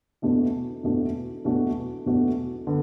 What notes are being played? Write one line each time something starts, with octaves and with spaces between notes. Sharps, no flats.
E2 B2 A3 D4 F#4
E2 B2 A3 D4 F#4
E2 B2 A3 D4 F#4
E2 B2 A3 D4 F#4
D3 B3